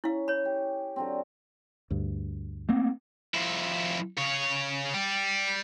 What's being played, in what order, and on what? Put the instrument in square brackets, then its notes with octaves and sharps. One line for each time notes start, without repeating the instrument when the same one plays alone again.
[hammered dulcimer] C#4 [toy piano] E4 F5
[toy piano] C#5 B5
[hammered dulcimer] G4
D3 F#3 C4
[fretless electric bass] D2 G2
[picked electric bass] A3 A#3 C4
[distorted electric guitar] F2 E4
C#3 C#5
G3